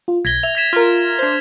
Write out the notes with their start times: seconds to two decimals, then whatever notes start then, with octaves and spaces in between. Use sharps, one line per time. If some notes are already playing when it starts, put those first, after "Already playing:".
0.08 F4
0.25 B1 G#6 A#6 B6 G7
0.43 E5 F7
0.55 G#6 B6 E7
0.73 F4 A#4 F6
1.19 D4 C5